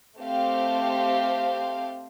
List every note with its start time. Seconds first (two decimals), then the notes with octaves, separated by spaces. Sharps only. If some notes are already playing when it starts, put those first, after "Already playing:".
0.19 A3 C4 G4 C5 F5